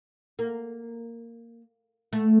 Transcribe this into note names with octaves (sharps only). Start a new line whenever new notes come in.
A#3
A3